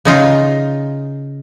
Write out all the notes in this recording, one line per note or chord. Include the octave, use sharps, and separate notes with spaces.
C#3 D#4 F4